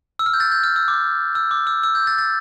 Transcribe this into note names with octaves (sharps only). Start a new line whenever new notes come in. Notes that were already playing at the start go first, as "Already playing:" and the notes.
E6
F6
G6
A6
G6
F6
E6
D6
E6
D6
E6
E6
G6
A6
A6